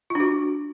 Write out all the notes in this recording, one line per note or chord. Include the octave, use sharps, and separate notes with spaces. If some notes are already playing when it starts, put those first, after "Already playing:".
D4 F4 F#4